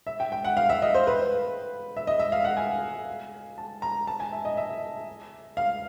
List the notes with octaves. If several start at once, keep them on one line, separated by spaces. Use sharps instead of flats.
E5
G5
G5
F#5
F5
E5
D#5
C5
B4
E5
D#5
E5
F5
F#5
G#5
A5
A#5
A5
G#5
E5
D#5
E5
F5